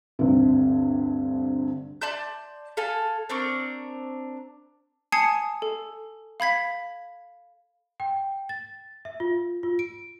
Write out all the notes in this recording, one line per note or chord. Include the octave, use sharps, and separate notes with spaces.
D2 G2 C3
D5 A5 C6 G6
A4 F5 G#5 A5
C4 D4 A#4 C#6
G#5 A5 D#6 G#6 C7 C#7
A4
F5 B5 G#6 B6
G5
A6
E5
F4
F4
D7